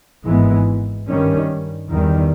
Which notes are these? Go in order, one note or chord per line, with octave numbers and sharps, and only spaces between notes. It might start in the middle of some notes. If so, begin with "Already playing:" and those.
G#1 G#2 E3 G#3 B3
G2 D#3 G3 C#4
E2 D#3 G3